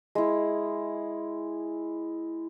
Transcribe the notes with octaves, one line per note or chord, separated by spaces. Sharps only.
G#3 E4